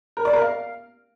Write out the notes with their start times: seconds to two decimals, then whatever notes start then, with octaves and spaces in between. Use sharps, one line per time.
0.17 A#4
0.25 D5
0.33 A#4
0.42 F5